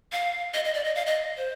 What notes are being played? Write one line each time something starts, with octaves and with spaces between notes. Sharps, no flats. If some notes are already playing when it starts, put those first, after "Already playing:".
F5
D#5
D#5
D5
D#5
F5
D#5
C5